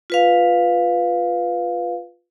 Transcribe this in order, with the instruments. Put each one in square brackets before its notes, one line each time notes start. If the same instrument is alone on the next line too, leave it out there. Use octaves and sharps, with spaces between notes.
[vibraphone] F4 B4 F5